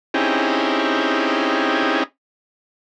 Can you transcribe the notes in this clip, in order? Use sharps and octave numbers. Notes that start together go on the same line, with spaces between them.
C4 C#4 D#4 E4 G4 G#4